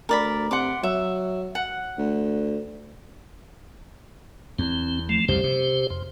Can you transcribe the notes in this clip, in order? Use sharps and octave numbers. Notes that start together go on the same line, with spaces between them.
D2 A#4 D5 B5
C3 F#5 C6 D6
F#3 E5
F#5
D2
E2 C4
F3 A3
C2 F#2 C#3 G4 C5
C3
F2